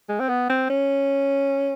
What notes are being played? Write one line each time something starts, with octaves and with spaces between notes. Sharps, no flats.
G#3
C4
B3
C4
C#4